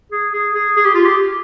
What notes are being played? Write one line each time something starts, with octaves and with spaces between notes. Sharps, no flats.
G#4
G#4
G#4
G#4
G4
F4
G4